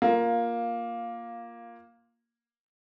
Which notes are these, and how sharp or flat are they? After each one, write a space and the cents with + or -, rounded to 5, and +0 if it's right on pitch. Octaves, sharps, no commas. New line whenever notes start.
A#3 +5 F4 +0